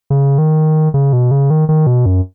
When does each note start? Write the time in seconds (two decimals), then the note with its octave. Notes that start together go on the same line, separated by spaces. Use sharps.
0.10 C#3
0.38 D#3
0.94 C#3
1.13 B2
1.31 C#3
1.50 D#3
1.69 D#3
1.87 B2
2.06 F#2